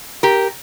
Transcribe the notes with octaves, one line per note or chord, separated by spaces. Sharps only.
G4 A#4